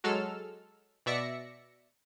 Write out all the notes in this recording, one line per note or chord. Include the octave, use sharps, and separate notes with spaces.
F#3 G#3 A4 E6 F6
B2 D5 E5 A#6 C#7